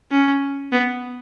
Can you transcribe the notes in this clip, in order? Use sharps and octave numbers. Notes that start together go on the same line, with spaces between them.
C#4
B3